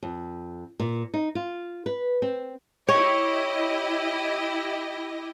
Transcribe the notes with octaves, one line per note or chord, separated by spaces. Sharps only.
F2
A#2
D#4
F4
B4
C4
E4 G4 C#5 D#5